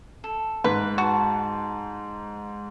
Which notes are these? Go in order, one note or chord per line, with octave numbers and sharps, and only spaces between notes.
A4
G#2 B4
F#4 A5